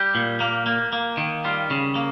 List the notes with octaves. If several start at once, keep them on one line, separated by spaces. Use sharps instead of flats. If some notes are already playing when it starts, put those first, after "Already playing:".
Already playing: G3 G4
A#2
A#3
A#3
A#3
D#3
G3 F4
C#3
A#3